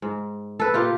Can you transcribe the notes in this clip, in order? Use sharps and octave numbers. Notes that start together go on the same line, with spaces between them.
G#2
A4 B4
A#2 F4 G4